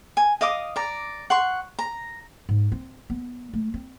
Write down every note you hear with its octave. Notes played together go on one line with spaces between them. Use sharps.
G#5
D#5 F5 D6 D#6
D5 A#5
F#5 C6 C#6
A#5
G#2
C4
B3
A3
C4